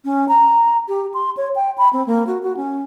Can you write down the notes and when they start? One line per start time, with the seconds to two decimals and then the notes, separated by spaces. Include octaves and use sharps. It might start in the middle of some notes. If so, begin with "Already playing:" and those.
0.05 C#4
0.29 A#5
0.88 G4
1.14 C6
1.37 C#5
1.56 G5
1.78 B5
1.93 C4
2.07 A#3
2.27 F#4
2.43 F#4
2.57 C#4